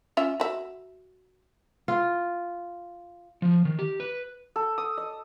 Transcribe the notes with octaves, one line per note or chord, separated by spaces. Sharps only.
C#4 F4 E5
F#4 E5
F4
F3
D#3
G4
B4
A4
D#6
D#5